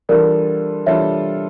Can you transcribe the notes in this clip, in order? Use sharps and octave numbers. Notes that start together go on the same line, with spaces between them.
E3 G3 D4 F4 A4 A#4 D5
E3 G3 D4 F4 A4 C#5 E5